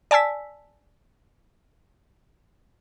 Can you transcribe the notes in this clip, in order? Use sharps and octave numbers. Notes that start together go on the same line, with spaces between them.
D5 G#5 A5 E6 B6